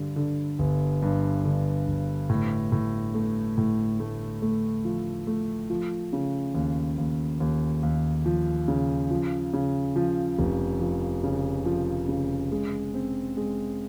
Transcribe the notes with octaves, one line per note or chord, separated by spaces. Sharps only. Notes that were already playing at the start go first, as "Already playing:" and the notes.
Already playing: G2 D3 G3
D3
G1
G2
D3
G1
A2
A2
A3
A2
A3
A3
F3
A3
F3
C#3
D#2
D#2
D#2
D#2
F3
C#3
F3
C#3
F3
F1
F3
C#3
F3
C#3
G#3
C4
G#3